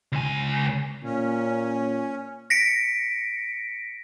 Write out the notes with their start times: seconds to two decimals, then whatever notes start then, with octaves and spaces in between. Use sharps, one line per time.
0.12 C#2 G#5
1.04 A#2 C#4
2.50 A#6 B6 C#7 D7